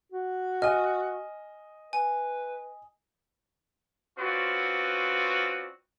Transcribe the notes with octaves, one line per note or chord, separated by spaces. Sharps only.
F#4
D#5 G#5 F6
B4 G#5
C4 C#4 F4 F#4 B4 D5